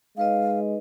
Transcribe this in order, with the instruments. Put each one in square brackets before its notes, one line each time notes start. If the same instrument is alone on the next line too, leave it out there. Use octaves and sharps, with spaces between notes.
[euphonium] G#3 [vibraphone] D#4 B4 D#5 [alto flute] F5